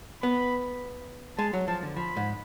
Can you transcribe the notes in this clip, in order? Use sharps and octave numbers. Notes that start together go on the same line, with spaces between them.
B3 B5
G#3 A5
F#3
F3 A5
D3
F3 B5
G#2